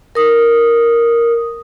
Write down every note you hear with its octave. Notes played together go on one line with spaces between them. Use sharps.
A#4 D#6